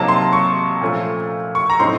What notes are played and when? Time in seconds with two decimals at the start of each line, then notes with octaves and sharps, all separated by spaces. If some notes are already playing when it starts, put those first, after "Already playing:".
Already playing: C3 F#3 A#3 D#4 A5
0.08 C6
0.33 C#6
0.81 A#2 F3 A3 C#4
1.55 C#6
1.70 A#5
1.79 A2 F#3 C4 D#4 C6